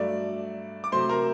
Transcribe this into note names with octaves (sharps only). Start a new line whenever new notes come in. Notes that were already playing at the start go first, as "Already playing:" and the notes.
Already playing: G2 F#3 A3 D5 D6
D6
C3 F#3 A3 C5 C6
A#4 A#5